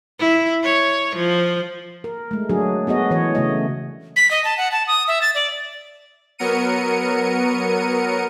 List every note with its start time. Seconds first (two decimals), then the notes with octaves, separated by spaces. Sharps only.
0.20 E4
0.64 C#5
1.16 F3
2.04 A#4
2.31 G#3 A3
2.49 F#3 D4 F#4 G#4
2.87 B3 F#4 G#4 D#5
3.10 E3 C#5
3.35 C#3 A3 D#5
4.16 B6
4.31 D#5
4.44 A5
4.58 F#5
4.72 A5
4.87 D#6
5.08 E5
5.22 A6
5.35 D5
6.38 F#3 B3 A#4 C#7 D#7